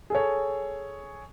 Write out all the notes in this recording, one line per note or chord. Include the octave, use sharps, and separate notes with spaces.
G#4 A4 C#5